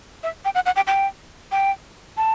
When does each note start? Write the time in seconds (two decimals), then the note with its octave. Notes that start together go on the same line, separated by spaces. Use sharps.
0.23 E5
0.45 G5
0.55 F#5
0.66 F#5
0.76 G5
0.87 G5
1.52 G5
2.17 A5